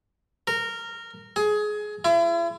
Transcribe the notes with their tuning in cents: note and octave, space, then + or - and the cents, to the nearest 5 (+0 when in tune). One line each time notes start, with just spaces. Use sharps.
A#4 -15
G#4 +20
E4 +40